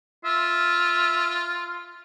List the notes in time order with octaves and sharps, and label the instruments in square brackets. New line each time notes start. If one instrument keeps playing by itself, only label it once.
[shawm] F4 [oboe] E5